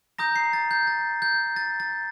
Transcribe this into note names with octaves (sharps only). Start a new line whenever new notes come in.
A#5 D#6 G6 A#6
C7
A6
G6
A6
G6
A6
A6